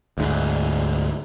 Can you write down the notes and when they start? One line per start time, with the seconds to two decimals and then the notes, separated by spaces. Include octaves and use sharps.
0.18 D2 G#2